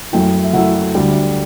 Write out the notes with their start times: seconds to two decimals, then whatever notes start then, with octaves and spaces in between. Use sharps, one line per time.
0.12 F#2 F#3 A3 E4 G5
0.44 E5
0.53 F#2 F#3 A3 E4 F#5
0.95 D2 D3 G3 D4 G5